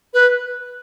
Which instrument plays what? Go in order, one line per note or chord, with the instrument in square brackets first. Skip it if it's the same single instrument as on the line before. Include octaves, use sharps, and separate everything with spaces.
[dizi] B4